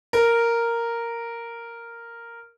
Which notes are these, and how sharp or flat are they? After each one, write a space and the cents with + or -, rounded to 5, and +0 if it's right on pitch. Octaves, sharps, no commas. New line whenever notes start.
A#4 -5